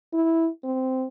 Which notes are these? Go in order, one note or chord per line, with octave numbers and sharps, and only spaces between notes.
E4
C4